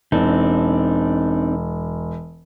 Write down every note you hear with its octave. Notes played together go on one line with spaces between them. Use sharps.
E1 C4 D4 D#4